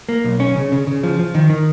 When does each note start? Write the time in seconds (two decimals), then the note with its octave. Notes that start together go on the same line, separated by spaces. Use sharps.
0.09 A#3
0.24 B1
0.40 C#4
0.56 C#3
0.72 C#3
0.87 C#3
1.03 F3
1.19 F3
1.35 D#3
1.50 D#3